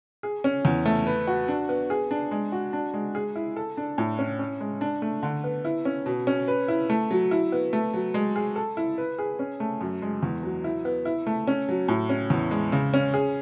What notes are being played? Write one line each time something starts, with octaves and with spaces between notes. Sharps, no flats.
G#4
C#4
E2
A3
B4
F#4
D4
B3
G#4
D4
G#3
F#4
D4
G#3
G#4
E4
A4
D4
A2
C#4
C#4
G#3
D4
A3
D3
B3
E4
C#4
B2
C#4
B4
E4
A3
F#3
E4
B3
A3
F#3
G#3
G#4
A4
E4
B4
G#4
C#4
A3
F#2
G#3
E2
F#3
E4
B3
E4
A3
C#4
F#3
A2
C#4
E2
G#3
C#3
C#4
G#4